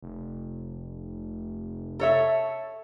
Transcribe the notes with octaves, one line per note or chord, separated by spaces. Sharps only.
F1
A4 C#5 E5